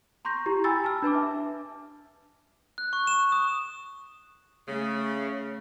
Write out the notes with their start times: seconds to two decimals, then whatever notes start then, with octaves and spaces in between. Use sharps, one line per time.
0.25 A#5 C6 C#6 G6 A#6
0.46 E4 G4 A#5
0.64 G5 G#5 B5 E6 A6
0.84 A5 F6
1.02 D4 B4 A5 D6
1.15 E5
2.78 F#6
2.93 C#6
3.07 E7
3.32 D#6
4.67 C#3 A3